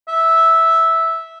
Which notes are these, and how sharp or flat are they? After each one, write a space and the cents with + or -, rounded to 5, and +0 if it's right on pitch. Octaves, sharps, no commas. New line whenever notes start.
E5 -10